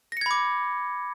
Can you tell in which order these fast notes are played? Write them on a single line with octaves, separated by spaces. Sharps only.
A#6 C#7 G#6 B5 D6